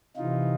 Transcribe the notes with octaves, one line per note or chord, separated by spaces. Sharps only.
C3 E3 D#4 F4